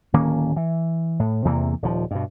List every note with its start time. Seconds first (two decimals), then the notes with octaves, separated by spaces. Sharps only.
0.13 D1 D#3 A#3 C#4
0.56 E3
1.19 A2
1.45 E2 C3 E3 A#3
1.82 D#1 F3
2.11 G2 B2